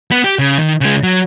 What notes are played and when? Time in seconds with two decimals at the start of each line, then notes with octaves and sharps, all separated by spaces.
0.11 B3
0.24 G4
0.39 C#3
0.59 D#3
0.81 C#3 G#3
1.03 F#3